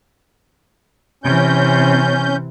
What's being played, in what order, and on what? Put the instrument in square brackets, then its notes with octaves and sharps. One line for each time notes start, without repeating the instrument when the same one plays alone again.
[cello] C3 E3 [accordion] C#4 G6